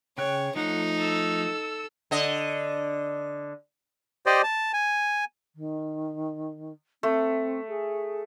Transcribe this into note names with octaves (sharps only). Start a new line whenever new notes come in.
C#3 C#5 G5 F#6
F3 A3 D#4 F#5
A4 E6
D3 D#5
G4 C5 D5 D#5
A5
G#5
D#3
A3 C4
G#4